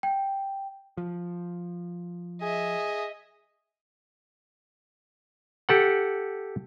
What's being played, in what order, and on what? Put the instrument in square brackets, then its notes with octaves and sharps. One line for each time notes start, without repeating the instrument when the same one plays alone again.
[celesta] G5
[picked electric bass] F3
[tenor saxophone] G#4 [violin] D#5 E5
[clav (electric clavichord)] G4 A4 F#5